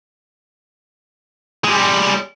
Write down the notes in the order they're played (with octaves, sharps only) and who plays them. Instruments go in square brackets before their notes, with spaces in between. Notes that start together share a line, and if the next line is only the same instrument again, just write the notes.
[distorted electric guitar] G3 G#3